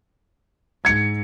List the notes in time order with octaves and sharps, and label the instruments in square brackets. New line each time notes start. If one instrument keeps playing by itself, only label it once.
[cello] G#2 [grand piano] G#6 C#7